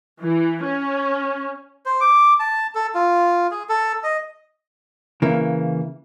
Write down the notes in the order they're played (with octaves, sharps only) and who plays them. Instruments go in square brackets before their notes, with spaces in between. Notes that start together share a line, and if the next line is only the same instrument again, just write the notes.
[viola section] E3
C#4
[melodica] C5
D6
A5
A4
F4
G#4
A4
D#5
[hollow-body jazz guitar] C#3 E3 A#3